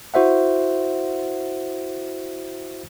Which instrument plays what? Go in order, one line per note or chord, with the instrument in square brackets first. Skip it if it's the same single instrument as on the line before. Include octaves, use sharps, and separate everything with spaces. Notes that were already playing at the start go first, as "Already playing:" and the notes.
[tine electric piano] E4 F#4 C5 E5 F#5